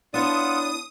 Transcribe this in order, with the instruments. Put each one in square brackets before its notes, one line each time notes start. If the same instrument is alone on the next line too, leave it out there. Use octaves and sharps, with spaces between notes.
[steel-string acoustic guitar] B3 E4 C#5 [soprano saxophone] D4 [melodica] F4 F#5 A5 [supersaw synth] D#6